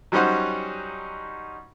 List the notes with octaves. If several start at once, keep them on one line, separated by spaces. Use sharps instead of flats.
F#3 G3 C#4 D#4 C5 F#5